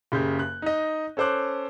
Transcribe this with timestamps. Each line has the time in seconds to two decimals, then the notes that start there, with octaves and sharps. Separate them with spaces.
0.12 F#1 C#3 G4 G6
0.39 F#6
0.62 D#4 D#5
1.17 C#4 A4 C5 D6 F#6